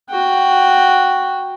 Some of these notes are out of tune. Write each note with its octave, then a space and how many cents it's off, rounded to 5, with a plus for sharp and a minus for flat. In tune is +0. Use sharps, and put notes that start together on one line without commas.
F#4 +0 G5 +0